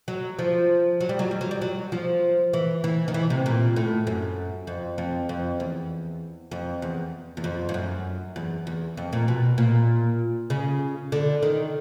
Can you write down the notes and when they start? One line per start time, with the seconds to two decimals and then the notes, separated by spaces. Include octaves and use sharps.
0.08 F#3
0.39 F3
1.00 F#3
1.09 G3
1.19 F#3
1.31 G3
1.41 F#3
1.51 G3
1.62 F#3
1.92 F3
2.53 E3
2.84 E3
3.08 D#3
3.14 E3
3.30 C3
3.46 A#2
3.76 A2
4.07 F#2
4.67 F2
4.98 F2
5.29 F2
5.60 E2
6.51 F2
6.82 E2
7.37 E2
7.44 F2
7.69 G2
7.74 F#2
8.36 E2
8.67 E2
8.97 F2
9.13 A#2
9.28 B2
9.58 A#2
10.50 C#3
11.12 D3
11.43 D#3